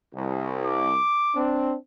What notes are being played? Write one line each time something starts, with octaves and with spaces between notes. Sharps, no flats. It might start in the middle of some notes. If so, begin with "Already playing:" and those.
C2
D6
C4 D4